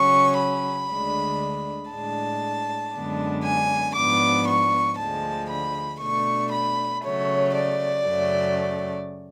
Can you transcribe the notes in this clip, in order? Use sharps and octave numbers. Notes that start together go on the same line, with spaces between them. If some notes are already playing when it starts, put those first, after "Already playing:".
Already playing: C#3 F#3 C#4 C#6
B5
D2 D3 G#3 D4
A2 G#3 D4 A5
F#2 D3 G#3 B3 D4
G#5
G#2 F3 B3 D4 D6
C#6
D2 D3 F3 G#3 A5
B5
B2 A3 D4 C#6
B5
C#3 F#3 A3 C#5
D5
F#2 C#3 F#3 A3